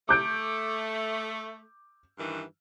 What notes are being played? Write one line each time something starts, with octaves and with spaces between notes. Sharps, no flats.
A3 D6 G6 D7
G2 D#3 E3